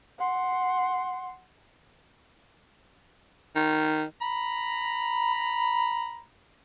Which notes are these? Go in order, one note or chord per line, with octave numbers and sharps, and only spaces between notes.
F#5 C6
D#3
A#5 B5